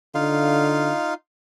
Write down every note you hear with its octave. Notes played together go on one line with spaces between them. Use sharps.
D3 D#4 F4 F5